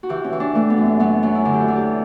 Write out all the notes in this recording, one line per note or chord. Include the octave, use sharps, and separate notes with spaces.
F#4
E3 G4
C#4
E3
D4
E3 A3
B3
F#2
B3
F#3 B3
F#3 C#4
E4
D3 D4
G4
F#4
E2
G4